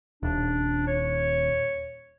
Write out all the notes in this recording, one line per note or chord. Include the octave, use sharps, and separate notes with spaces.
D#1 D4
C#5